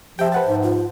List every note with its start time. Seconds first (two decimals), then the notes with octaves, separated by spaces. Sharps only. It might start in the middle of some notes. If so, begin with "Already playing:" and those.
0.19 F3 G4 E5 G5
0.32 B4 C5 F#5 A5
0.47 G#2
0.63 F4